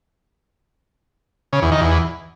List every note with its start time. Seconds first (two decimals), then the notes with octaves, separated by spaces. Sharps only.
1.53 C#3
1.62 E2
1.72 D#3
1.81 E2